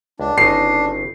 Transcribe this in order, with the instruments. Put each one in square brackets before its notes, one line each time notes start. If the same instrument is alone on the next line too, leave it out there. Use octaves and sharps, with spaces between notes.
[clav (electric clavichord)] C#2 [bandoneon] D4
[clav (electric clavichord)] G1 C#3 D#4 [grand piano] C7